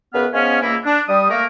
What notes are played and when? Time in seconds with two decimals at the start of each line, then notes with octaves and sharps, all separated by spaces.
0.14 F#2 C#3 B3 B4 F6
0.33 F3 G#3 B3 C#4
0.62 C#2 A#3 E4
0.85 D4
1.08 G3 D#6
1.30 A3 A#3 A#4